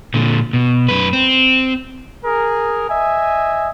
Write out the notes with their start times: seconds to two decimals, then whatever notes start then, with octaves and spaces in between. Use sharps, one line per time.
0.14 A#2 D3
0.53 B2
0.88 F#2 B4
1.13 C4
2.23 G#4 A#4
2.89 D#5 E5 G#5